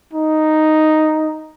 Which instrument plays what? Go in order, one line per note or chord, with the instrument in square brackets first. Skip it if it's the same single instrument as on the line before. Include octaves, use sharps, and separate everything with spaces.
[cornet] D#4